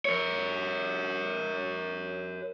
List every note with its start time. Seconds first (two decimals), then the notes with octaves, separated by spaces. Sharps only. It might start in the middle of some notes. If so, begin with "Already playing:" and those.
0.05 A#4 C#5